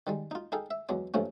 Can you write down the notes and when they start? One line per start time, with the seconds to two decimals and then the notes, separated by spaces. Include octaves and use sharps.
0.07 D#3 G3 G#3
0.31 D#4 F4
0.52 D#4 G#4 A4 F5 G5
0.71 E5
0.89 E2 F#3 G#3 D6
1.14 A#1 G2 A#2 F3 A3 C#4